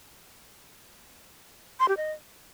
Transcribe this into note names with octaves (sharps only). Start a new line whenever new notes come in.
C6
G4
D#5